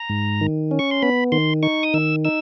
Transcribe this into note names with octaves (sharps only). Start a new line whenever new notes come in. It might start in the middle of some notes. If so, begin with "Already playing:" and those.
Already playing: A#5
G#2
D#3
C#4
C#6
C6
B3 B5
D#3 C6
D#4 C#6
D#6
D#3 E6
D#4 E6